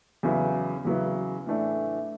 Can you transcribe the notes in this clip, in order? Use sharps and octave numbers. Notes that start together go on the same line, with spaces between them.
E2 C#3 F#3 B3 E4
E2 C#3 F#3 B3 E4
A2 E3 A3 D4